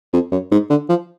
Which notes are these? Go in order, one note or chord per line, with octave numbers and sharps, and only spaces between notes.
F2
F#2
G#2
D3
F3